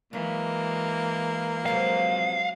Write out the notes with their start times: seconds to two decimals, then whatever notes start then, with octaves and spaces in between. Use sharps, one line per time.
0.13 E3 F#3 G#3 A#3
1.66 C3 F3 F#3 G#3 B3 F5